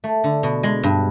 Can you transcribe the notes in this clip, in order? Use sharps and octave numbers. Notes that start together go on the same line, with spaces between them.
A3
D3
B2
G#3
G2